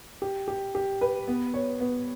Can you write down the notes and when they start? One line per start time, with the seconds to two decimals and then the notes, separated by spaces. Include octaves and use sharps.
0.22 G4
0.48 G4
0.75 G4
1.01 B4
1.28 B3
1.54 C#5
1.80 B3